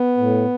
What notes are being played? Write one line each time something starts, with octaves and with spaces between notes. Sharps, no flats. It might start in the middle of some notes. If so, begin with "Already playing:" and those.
Already playing: B3
A2